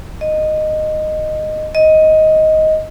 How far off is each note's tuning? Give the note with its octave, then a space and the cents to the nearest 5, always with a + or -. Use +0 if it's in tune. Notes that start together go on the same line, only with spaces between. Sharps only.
D#5 -10
D#5 +10